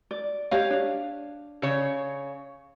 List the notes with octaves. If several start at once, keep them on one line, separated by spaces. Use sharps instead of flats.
D5
G4 C#5 D#5 F5
D4
C#3 C#5